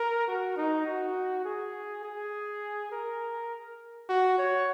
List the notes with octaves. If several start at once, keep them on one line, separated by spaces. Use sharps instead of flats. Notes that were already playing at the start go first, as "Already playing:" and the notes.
Already playing: A#4
F#4
D#4
F#4
G#4
G#4
A#4
F#4
C#5